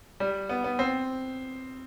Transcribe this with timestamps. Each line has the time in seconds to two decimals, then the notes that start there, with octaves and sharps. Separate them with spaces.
0.20 G3
0.49 B3
0.64 B3
0.79 C4